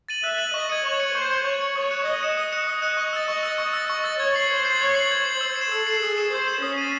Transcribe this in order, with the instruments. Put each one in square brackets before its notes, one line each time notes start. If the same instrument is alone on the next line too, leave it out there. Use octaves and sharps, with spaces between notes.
[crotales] A6 D#7 F#7
[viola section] E5 [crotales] F#6
[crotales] A6 D#7 F#7
[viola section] D#5 [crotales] C#6
[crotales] G#6 C#7
[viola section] C#5 [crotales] C#6
[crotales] G#6 C#7
[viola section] C5 [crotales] C#6
[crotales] G#6 C#7
[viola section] C#5 [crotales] C#6
[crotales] G#6 C#7
[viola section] C#5 [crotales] D#6
[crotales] F#6 C#7 E7
[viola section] D#5 [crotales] D#6
[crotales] F#6 C#7 E7
[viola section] D#5 [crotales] D#6
[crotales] F#6 C#7 E7
D#6
F#6 C#7 E7
C#6
E6 A6
[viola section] D#5 [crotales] C#6
[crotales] E6 A6
C#6
E6 A6
[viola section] D#5 [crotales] C#6
[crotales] E6 A6
[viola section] C#5 [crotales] G#6
[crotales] C7 F#7
[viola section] C5 [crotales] G#6
[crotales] C7 F#7
[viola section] C#5 [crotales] G#6
[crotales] C7 F#7
[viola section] C5 [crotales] G#6
[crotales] C7 F#7
E6
C7
E7
[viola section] A4 [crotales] E6
[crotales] C7 E7
[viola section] G#4 [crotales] E6
[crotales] C7 E7
[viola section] C5 [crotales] E6
[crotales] C7 E7
[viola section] C#4 [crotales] D#6
[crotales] A6 D#7